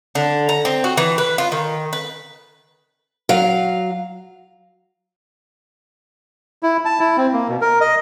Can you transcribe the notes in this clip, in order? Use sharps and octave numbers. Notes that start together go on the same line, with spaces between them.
D3
A#5
C4
F#4
E3
B4
F4
D#3
B4
F#3 F5
E4
A5
E4
C4
A#3
B2
A#4
D#5